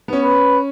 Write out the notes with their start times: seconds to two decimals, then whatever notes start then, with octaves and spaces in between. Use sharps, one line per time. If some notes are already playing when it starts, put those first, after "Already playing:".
0.08 B3
0.13 C#4
0.23 B4